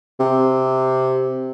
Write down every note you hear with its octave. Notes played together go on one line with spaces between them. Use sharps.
C3